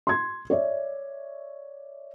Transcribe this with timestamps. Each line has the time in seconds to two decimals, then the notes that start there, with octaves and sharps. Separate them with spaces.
0.07 C6 G#6
0.50 C#5 D5 E5